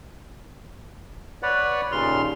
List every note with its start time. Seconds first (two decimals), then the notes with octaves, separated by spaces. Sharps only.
1.43 B4 C#5 D5 F#5
1.92 D#2 A#2 C#3 C6 F6